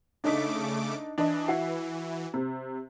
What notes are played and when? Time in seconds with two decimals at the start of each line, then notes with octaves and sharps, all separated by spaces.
0.24 C#3 A3 D4 D#4 D6 B6
1.18 E3 D4 D#5
1.48 E4 F#4 C7
2.34 C3